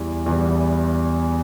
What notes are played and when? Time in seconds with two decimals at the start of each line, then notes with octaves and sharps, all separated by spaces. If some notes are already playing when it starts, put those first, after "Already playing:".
Already playing: E2 E3 G3
0.26 E2 E3 G3